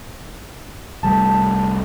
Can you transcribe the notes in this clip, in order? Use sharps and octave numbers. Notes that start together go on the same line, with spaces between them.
C2 G3 A3 A5